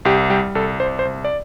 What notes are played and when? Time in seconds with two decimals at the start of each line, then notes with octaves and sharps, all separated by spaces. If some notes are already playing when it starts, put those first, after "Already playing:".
0.05 C2 G4
0.30 G3 G4
0.55 C2 A4
0.80 C2 C5
0.99 C5
1.05 C2
1.25 D5